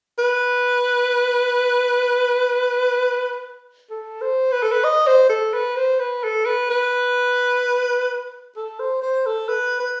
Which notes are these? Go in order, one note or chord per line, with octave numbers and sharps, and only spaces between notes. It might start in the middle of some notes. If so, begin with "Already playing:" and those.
B4
A4
C5
B4
A4
B4
D#5
C5
A4
B4
C5
B4
A4
B4
B4
A4
C5
C5
A4
B4
B4